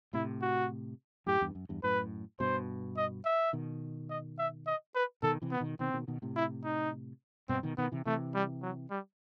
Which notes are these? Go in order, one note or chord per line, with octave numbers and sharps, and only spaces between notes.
A2 C3 E4
F#4
F#2 A2 G4
E2 G2
F#2
E2 G2
F#2 A2 B4
G2 B2 C5
D#5
E5
B2 D#3
D#5
E5
D#5
B4
B2 D#3 A4
C3 E3
B3
B2 D#3
B2 D#3 C4
B2 D#3
B2 D#3
A2 C3
E4
D#4
G2 B2 C4
B2 D#3
B2 D#3 B3
C3 E3
C3 E3 A3
G3
F#3
G3